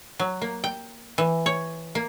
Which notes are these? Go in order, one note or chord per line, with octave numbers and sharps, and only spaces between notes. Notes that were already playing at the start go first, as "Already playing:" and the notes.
F#3
A#3
G5
E3
C#5
A#3